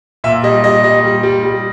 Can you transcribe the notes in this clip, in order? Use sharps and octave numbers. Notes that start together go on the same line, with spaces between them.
A#2 E5
G3 D#5
G3 D#5
G3 D#5
G3
G3
G3